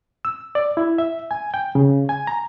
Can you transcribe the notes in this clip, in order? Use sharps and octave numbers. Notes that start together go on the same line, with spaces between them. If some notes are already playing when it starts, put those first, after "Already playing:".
E6
D5
E4
E5
G#5
G5
C#3
G#5
A#5